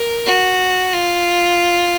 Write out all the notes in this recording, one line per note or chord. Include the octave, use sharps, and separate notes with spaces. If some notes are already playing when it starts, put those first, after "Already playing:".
Already playing: A#4
F#4
F4